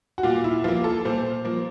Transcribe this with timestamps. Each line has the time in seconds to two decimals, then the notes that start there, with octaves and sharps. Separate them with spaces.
0.18 F#4
0.23 A#2 F4
0.44 E4
0.64 F3 A#3 F4
0.84 A4
1.05 A#2 C5
1.45 F3 A#3